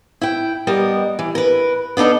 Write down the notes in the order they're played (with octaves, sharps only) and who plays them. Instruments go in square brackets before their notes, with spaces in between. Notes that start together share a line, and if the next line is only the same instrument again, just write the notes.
[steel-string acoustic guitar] E4 G5
G3 B3 A#4 D#5
E3
A#4 B4
B3 D4 D#4 A4